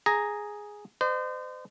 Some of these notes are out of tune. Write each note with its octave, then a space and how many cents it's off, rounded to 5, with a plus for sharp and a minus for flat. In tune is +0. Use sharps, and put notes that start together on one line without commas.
G#4 +0 A#5 +0
C5 -35 D#5 -45